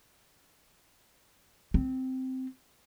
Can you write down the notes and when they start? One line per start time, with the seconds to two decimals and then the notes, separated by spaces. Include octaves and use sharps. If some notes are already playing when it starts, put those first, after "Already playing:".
1.74 C4